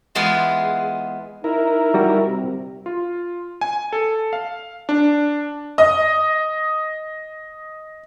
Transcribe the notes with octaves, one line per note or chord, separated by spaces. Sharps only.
E3 G#3 B3 F4 G#4
D#4 E4 A#4
G3 F#4
C3
F4
G#5
A4
F5
D4
D#5 D#6